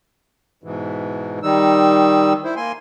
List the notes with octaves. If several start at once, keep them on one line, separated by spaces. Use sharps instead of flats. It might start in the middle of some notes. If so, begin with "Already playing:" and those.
G#2 B2 E3
D#3 G3 D#4 E6
E4 C5
A#3 G#5 C6